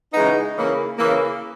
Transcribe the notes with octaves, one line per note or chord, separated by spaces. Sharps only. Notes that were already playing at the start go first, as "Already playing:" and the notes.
C#3 E3 G#3 B3 D#4
C#3 E3 A#3
C#3 E3 A#3